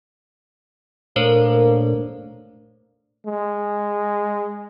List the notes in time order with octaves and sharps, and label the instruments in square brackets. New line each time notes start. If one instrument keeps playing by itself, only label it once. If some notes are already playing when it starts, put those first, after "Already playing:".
[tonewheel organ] A#2 A3 D4 [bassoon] A#3 [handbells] A#4 C5 C#5
[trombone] G#3